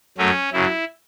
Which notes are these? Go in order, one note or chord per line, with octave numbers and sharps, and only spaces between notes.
F#2 F#3 A3 C#4
F#2 C#3 F#3 E4